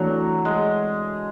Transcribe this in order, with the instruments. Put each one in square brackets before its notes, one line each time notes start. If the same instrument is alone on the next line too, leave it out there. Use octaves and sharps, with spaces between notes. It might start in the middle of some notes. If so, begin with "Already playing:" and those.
Already playing: [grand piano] E3 A3 D4 F#4 [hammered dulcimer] F#3
[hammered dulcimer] G#3